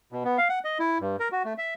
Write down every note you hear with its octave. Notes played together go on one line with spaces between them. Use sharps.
B2
B3
F5
F#5
D#5
E4
G2
A#4
F#4
A3
E5